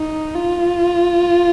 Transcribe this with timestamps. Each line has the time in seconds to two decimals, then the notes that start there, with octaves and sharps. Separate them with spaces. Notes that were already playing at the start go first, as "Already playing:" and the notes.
Already playing: D#4
0.35 F4